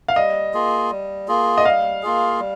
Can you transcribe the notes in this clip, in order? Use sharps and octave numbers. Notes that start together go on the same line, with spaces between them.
F5
G3 D#5
A#3 F4 G#4
G3
A#3 F4 G#4
D#5
G3 F5
A#3 F4 G#4
G3